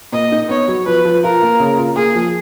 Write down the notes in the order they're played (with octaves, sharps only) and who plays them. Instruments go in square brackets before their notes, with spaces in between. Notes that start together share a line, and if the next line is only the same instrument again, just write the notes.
[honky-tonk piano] A#2 [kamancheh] D#5
[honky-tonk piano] D#4
[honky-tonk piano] B3 [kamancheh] C#5
[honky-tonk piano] F#3
[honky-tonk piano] F3 [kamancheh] B4
[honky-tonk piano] F3
[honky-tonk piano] F4 [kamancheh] A#4
[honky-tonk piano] A#3
C#3
F4
[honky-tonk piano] A#3 [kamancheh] G#4
[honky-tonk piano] F3